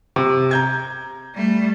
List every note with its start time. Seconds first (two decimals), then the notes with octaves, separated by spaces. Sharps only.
0.16 C3
0.51 A#5 G6 G#6
1.34 G3 A3